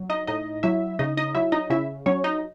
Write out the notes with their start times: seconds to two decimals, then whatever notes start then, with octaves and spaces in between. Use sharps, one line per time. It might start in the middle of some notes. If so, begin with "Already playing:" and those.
Already playing: F#3
0.10 D#4 D#5
0.27 A2 D#4 D#5
0.63 F#3 E4 E5
0.99 C#3 D#4 D#5
1.17 D#4 D#5
1.35 F#3 E4 E5
1.52 D#4 D#5
1.70 C#3 E4 E5
2.06 F#3 C#4 C#5
2.24 D#4 D#5